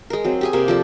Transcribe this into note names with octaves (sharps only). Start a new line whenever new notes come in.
G#3 A#4
F#3 C4
G4 G#4 G#5
C3 A#3 G4 A#4
F3 A4 D5